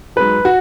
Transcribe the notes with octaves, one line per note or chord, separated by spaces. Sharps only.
G#2 F#3 B4
F#4